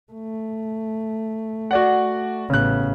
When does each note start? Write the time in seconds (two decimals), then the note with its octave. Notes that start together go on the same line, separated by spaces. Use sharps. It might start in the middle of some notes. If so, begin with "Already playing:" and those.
0.12 A3
1.71 F#4 D5 F#5
2.50 A1 C#3 B3 F#6